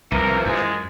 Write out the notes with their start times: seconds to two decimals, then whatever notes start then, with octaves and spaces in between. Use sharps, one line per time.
0.12 C2 E3 F3 A#4
0.46 F#2 G#3